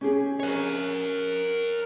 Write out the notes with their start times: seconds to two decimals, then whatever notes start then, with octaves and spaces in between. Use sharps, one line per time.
0.01 C#4 G4 G#4
0.40 A#4 C#5